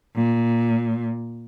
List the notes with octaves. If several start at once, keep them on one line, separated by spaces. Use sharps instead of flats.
A#2